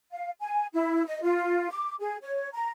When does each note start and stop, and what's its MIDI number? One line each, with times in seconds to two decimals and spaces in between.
0.11 0.30 77
0.40 0.66 80
0.73 1.05 64
1.06 1.19 75
1.22 1.71 65
1.71 1.94 86
1.99 2.17 68
2.22 2.48 73
2.53 2.71 82